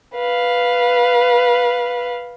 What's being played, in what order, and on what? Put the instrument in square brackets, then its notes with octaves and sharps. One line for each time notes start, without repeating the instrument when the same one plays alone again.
[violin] B4 F5